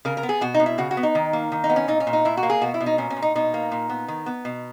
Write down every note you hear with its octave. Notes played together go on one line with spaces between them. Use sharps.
C#3 A#4
A#4
B3
G#4
B2 F#4
D#4
B2
E4
C#3 F#4
F#4
B3
D#4
D#3
A#3
D#3
D#4
B3
C#4
A#2 D#4
C#4
A#2
D#4
A#2 E4
F#4
A#3
G#4
B2 F#4
E4
B2
D#4
A#2 C#4
C#4
A#2
D#4
B2 D#4
A#3
A#2
B3
D#3
B3
B2